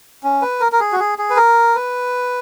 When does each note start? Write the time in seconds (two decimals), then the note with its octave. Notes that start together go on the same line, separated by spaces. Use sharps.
0.24 C#4
0.42 B4
0.60 A#4
0.72 A#4
0.80 G#4
0.92 F#4
1.00 G#4
1.18 G#4
1.30 B4
1.37 A#4
1.75 B4